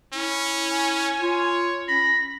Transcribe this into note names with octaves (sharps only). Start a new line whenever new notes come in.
C#4 E4
G#5
F4 C#5
C#4 B5 A#6